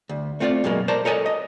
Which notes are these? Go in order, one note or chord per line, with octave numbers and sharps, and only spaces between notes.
D2
A3 C4 F4 C#5 D5
F#2 B2 F#3 G#3 A#3
A#4 C5 D5 A5 A#5
A4 A#4 C#5 D#5 G#5 A5
D#5